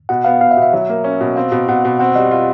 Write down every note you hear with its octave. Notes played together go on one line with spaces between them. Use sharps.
B2 F#5
B3 F5
B2 F5
E5
B2
E5
F#3
A#3
C#4
B2
C4 F5
B2
B2 F#5
B2
C4 F#5
G3 D#5
F4